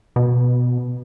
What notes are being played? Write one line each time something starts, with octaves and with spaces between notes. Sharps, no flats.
B2